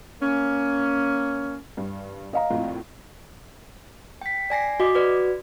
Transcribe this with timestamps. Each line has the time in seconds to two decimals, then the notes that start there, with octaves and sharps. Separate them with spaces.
0.22 A#3 C#4
1.77 G2
2.33 D#5 F5 A#5
2.51 A#1 F2 A2
4.21 G5 B6
4.50 D5 G#5 A#6 C7
4.80 F#4 D#5 D6
4.95 F#4 B4 D5